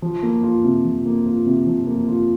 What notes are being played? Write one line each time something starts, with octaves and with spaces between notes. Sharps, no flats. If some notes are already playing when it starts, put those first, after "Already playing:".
F3
A#3
F4
C3
F3
A#3
F4
C3
F3
A#3
F4